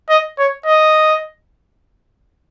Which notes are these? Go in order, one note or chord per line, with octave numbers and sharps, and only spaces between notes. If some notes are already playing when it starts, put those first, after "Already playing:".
D#5
C#5
D#5